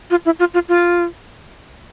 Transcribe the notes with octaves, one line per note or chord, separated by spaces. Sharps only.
F4
E4
F4
F4
F4